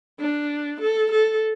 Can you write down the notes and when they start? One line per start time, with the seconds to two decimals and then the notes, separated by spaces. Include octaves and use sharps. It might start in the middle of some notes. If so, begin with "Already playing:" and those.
0.19 D4
0.80 A4
1.11 A4